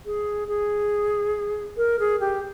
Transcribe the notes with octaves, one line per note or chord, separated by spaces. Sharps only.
G#4
G#4
A#4
G#4
G4